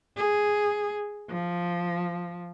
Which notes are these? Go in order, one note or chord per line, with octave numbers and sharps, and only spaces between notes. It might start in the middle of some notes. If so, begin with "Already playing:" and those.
G#4
F3